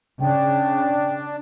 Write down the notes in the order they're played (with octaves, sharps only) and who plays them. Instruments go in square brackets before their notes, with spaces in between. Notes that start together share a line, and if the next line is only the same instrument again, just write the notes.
[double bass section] C#3 [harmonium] D4 [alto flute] G5